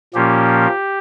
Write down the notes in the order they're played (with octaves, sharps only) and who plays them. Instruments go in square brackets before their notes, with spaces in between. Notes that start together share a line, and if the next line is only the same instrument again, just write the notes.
[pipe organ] A#2 F3 A#3 C#4 G4